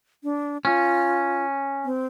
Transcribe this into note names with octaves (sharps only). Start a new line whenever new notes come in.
D4
C#4 F4
C4